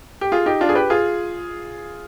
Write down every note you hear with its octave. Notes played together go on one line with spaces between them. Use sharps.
G4
F4 G#4
D#4 G4
D4 F4
G#4
G4 B4
F4 G#4